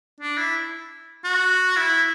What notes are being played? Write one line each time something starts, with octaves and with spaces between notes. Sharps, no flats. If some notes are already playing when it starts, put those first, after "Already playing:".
D4
E4
F#4
E4